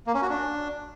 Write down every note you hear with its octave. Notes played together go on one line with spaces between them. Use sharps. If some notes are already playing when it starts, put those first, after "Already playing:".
A#3
C#4
F#4
D4